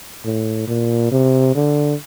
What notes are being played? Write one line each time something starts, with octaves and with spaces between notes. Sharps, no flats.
A2
A#2
C3
D3